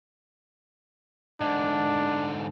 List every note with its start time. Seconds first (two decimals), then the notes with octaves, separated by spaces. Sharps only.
1.41 G#2 D3 D4